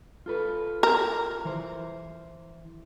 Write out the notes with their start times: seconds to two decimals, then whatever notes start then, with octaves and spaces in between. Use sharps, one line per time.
0.26 F4 A4 B4
0.83 A#4
1.45 E3 C5